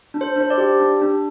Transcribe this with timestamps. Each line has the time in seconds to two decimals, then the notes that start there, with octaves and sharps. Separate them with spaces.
0.14 D4
0.21 C5
0.36 D4 C5
0.50 D5
0.58 G4
0.80 D4
1.01 D4